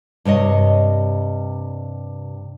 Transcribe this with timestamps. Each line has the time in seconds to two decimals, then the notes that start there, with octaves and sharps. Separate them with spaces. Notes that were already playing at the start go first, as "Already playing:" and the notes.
0.25 G2 C3 C#5 D#5